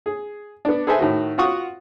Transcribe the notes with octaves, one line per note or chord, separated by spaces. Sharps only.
G#4
B3 D4
G#4 A4 B4 C5 E5 G#5
A2 D#3 F#4
F4 F#4 F#5 C#6 D#6